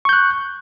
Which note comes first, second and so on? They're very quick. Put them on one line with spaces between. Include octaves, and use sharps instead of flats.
C#6 G6 F#6